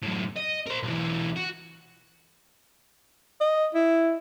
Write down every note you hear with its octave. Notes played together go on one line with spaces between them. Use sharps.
F#2 A2
D#5
A#4 C5
B1 E3
F#4
D#5
E4